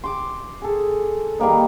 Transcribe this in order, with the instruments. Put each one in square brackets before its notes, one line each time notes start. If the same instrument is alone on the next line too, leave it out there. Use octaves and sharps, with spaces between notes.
[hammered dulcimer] C6 D6
G#4 A4
D#3 G3 A#3 D#4